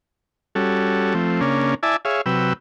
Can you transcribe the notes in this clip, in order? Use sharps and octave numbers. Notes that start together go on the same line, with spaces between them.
G3 C#4 F#4 A4
F3 A3 C4
C#3 A#3 C#4 D4
E4 D5 E5 G#5 A5
G#4 C#5 E5 F5
C3 F#3 B4 G5 E6